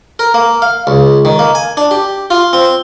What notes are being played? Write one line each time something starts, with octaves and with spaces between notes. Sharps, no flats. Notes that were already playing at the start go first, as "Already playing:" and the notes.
A#4
A#3
F5
C#2
D#3
A#3
G#5
D4
G4
F4
C4